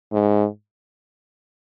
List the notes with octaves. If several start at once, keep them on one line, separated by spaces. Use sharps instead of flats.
G#2